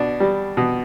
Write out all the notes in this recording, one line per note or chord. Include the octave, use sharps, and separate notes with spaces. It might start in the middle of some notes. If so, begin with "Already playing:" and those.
Already playing: B2 D4
G3
B2